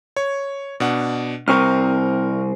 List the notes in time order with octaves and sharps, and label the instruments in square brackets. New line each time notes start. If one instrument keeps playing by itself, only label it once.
[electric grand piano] C#5 C#6
B2 D4 F#5
[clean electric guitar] C2 C4 [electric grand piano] A#4 C#6 F6